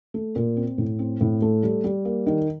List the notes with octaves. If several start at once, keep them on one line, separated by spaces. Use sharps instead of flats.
A3
A#2
C4
A2
C4
A2
A3
G3
G3
A#3
D#3